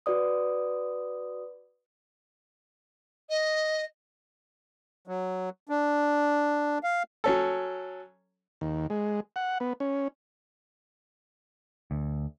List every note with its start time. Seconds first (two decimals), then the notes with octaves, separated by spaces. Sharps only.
0.06 F#4 B4 D5 D#6
3.30 D#5
5.07 F#3
5.69 D4
6.84 F5
7.24 F#3 C#4 A4
8.61 D#2
8.90 G#3
9.36 F#5
9.60 B3
9.80 C#4
11.91 D2